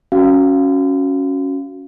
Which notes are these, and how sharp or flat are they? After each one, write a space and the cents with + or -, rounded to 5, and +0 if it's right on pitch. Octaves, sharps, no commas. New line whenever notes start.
C#4 +0 F#4 +0 F5 -10